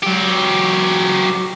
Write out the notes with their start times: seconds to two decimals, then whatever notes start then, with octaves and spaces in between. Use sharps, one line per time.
0.03 F#3 G4